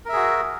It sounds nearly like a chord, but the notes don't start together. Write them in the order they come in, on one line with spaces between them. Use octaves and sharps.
A#4 E5 G#4 F#4